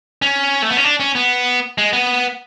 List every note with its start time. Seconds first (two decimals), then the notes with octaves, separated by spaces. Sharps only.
0.22 C#4
0.62 A3
0.70 B3
0.77 C#4
0.84 D4
1.00 C#4
1.15 B3
1.78 G#3
1.93 B3